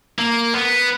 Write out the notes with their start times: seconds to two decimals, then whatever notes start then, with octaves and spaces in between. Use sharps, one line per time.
0.19 A#3
0.54 B3